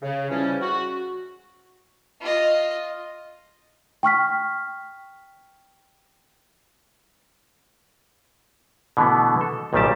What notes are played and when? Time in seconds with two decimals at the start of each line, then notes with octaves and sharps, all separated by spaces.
0.02 C#3
0.29 C#3 E3 F3 G3 C#4
0.61 F#4
2.21 F4 D#5
4.03 G5 C#6 F6 B6
8.97 B2 D3 E3 A3 B3
9.41 A4
9.73 B1 A#2 D#3 G3 G4 A5